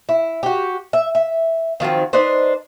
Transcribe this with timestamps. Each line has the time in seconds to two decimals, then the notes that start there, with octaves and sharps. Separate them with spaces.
0.09 E4
0.43 F#4 G4
0.93 E5
1.15 E5
1.80 D#3 F3 F#3 C4
2.13 D4 D#4 B4 C5